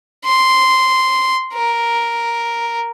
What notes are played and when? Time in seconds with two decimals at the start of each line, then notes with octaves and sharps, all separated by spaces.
0.25 C6
1.54 A#4